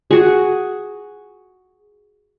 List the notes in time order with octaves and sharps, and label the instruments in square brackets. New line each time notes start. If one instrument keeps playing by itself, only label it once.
[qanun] F#4 G#4